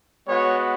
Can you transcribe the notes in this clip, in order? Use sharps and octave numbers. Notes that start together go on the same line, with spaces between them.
G#3 B3 F#4 C#5